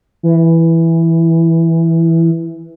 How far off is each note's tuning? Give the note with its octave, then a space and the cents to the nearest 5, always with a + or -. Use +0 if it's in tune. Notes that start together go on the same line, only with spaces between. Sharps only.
E3 +0